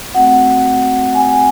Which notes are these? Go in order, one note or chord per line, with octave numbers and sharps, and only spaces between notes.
A3 C4 F#4 F#5
G#5